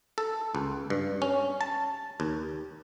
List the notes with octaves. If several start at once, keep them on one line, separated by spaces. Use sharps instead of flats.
A4
C#2
G2
C#4
A5
D#2